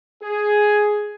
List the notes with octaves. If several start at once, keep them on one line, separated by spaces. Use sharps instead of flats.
G#4